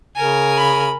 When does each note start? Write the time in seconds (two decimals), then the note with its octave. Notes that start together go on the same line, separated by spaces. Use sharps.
0.16 C#3 A#4 G#5
0.57 B5